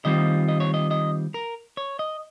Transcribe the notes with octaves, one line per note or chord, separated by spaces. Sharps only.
D#3 G3 C4 F4 D#5
D#5
C#5
D#5
D#5
A#4
C#5
D#5